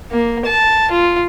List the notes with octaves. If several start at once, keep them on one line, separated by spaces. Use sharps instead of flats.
A#3
A5
F4